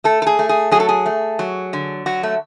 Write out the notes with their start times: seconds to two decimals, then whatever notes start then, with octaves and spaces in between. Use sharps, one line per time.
0.04 A3 A4
0.22 A4
0.26 G#4
0.39 A3
0.49 G#4
0.71 F#3 G#4
0.80 A4
0.89 G#4
1.06 A3
1.39 F#3
1.73 D3
2.06 F#3 F#4
2.23 A3